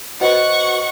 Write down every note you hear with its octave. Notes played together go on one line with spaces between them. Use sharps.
F#4 B4 C5 D#5 F#5 C#6